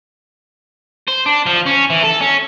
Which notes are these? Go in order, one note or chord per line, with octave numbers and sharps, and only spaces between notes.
C5
D4
F3
C#4
E3
A4
C#4